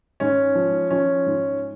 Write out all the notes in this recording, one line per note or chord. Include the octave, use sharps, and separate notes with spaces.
G#2 C#4
F3
F3 C#4
G#2